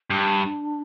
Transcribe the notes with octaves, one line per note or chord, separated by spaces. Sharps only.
G2 D4